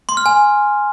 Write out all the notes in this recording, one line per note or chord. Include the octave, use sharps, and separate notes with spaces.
C6
F6
G#5